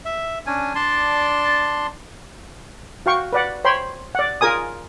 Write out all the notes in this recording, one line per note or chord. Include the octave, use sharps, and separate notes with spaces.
E5
C#4 D4 G#5
D4 D5 A5 C6
F#4 F5 G5 C#6
B4 D5 F#5
C5 C#5 G5 B5 C6
D5 F#5
F4 G#4 A#4 G#5 D#6